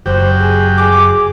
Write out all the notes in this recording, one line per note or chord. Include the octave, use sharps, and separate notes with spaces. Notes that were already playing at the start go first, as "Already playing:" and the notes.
F#1 F#3 G4 C5
G#4
G#4 D6